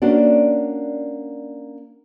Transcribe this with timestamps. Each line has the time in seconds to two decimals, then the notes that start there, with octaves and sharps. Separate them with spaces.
0.02 A#3 C#4 D4 F#4 D5